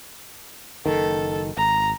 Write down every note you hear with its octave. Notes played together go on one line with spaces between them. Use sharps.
F#1 D#3 A4
G#1 A#5